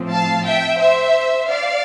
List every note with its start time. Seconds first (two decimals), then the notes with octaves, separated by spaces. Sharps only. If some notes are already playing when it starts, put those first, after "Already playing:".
Already playing: A2 F3 C4
0.11 F5 A5
0.46 E5 G5
0.79 C5 E5
1.49 D5 F5